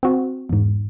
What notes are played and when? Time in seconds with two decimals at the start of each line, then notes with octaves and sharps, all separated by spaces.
0.03 C4 F#4
0.49 E2 G#2